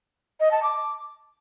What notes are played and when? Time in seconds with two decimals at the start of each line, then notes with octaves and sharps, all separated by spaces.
0.40 D#5
0.51 A5
0.62 D6